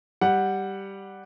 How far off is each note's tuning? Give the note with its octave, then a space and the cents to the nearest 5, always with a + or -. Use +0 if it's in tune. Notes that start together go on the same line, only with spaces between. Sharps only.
G3 +0 F#5 +0